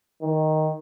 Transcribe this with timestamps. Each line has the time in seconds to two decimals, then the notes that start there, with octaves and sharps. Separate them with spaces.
0.22 D#3